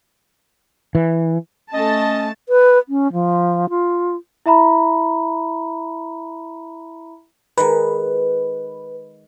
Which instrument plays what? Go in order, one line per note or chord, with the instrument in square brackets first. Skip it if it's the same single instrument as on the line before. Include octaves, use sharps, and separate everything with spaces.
[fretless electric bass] E3
[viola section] A3 A5 [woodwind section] C#4 D#5
[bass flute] B4
C#4
F3
F4
[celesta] E4 E5 A#5 B5
[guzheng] D#3 G#3 [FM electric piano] B4